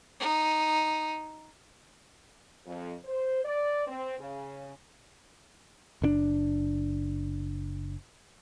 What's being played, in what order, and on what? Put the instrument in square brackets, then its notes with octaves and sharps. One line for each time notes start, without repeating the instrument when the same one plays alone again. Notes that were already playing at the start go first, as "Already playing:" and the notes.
[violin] D#4
[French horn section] F2
C5
D5
C4
C#3
[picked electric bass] F#1 C3 D4